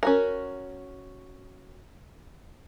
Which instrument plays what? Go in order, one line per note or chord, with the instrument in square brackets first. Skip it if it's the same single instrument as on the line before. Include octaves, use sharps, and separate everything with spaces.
[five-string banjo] C#4 F#4 A#4